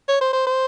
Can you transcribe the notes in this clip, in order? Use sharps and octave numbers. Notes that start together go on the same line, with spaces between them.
C#5
C5
C5
C5